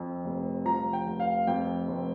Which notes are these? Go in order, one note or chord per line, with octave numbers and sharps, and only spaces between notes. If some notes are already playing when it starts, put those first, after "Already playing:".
Already playing: F2
F1
F3 A#5
G5
F1
F5
F2 G5
F1